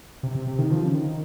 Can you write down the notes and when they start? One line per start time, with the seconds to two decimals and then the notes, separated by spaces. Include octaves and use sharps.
0.23 C3
0.36 C3
0.48 C3
0.59 D#3
0.71 F3
0.84 C#3
0.94 D#3